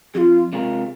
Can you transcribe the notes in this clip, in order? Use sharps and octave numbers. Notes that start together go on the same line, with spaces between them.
F2 F4 G#4
C3 G#3 F4 A#4